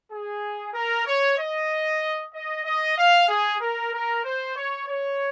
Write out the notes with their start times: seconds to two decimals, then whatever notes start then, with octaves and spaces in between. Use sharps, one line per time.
0.11 G#4
0.74 A#4
1.06 C#5
1.38 D#5
2.33 D#5
2.65 D#5
2.97 F5
3.28 G#4
3.61 A#4
3.93 A#4
4.23 C5
4.56 C#5
4.88 C#5